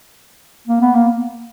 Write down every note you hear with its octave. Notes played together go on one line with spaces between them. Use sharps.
A#3
B3
A#3